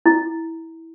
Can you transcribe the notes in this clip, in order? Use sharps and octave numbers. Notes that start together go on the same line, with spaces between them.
E4